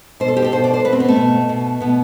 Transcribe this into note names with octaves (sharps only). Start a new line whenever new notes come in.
B2 C5
A4
G4
A4
B2 C5
D5
C5
B2 B4
C4
B3
A3
B2
B2
B2 B3